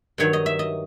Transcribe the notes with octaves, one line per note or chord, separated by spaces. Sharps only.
G2 D#3 F#3 C#5
D#5
E5
D#5